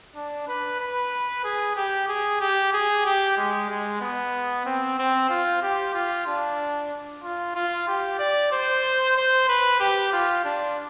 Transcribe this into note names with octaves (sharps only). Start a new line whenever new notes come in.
D4
B4
B4
G#4
G4
G#4
G4
G#4
G4
G#3
G#3
B3
C4
C4
F4
G4
F4
D4
F4
F4
G4
D5
C5
C5
B4
G4
F4
D4